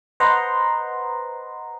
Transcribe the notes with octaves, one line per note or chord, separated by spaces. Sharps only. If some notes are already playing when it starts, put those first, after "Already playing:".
B4 C5 D#5 F#5 A#5 C6